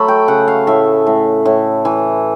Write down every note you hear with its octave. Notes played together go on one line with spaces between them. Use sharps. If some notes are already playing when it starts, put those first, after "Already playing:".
Already playing: F#3 A3 B5
G5
C#3 F#5
F5
A2 E5
A2
A2
E3